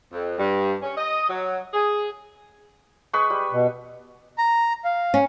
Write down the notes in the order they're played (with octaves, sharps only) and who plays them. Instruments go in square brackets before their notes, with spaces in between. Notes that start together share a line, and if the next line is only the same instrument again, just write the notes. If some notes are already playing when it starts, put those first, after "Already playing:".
[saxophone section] F2
G2
C#4
D#5
F#3
G#4
[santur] G#3 B4 C#6
G3
[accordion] B2
[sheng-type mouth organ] A#5
F5
[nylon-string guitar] C#4